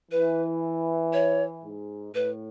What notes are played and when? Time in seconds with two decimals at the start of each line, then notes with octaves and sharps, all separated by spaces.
0.12 E3 B4
1.13 C#5
1.63 G#2
2.14 A2 B4